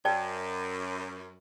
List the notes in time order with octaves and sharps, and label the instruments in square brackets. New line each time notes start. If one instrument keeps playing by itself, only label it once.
[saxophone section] F#2 [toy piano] D5 G5 A5